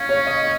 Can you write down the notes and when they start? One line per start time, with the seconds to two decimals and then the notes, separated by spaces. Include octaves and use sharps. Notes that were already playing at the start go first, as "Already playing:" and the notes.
Already playing: C#4 F5
0.09 C#5
0.26 D#5